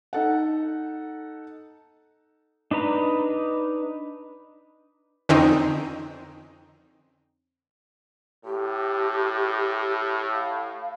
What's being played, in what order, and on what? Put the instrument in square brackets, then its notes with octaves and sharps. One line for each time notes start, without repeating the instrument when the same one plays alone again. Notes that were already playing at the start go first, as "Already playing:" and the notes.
[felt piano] D#4 A4 F#5
[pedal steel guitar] D4 D#4 B4 A#5
[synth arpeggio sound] F2 D3 C4 C#4 D#4
[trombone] A2 [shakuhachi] G4
[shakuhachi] F5